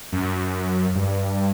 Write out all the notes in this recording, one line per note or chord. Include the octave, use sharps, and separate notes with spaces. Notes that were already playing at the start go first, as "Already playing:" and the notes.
F#2
G2